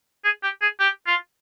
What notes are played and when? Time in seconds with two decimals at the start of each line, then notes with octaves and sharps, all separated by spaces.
0.24 G#4
0.43 G4
0.61 G#4
0.79 G4
1.07 F4